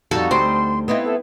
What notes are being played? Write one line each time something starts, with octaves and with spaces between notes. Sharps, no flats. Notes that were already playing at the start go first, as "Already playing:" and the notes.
F2 G3 D#4 F#4 A4
D2 G3 C5 C6
B3 C4 E4 D#5
A4